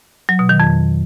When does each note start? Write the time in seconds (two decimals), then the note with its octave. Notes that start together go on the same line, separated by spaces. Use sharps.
0.29 F#3
0.39 B2
0.49 D#3
0.60 F2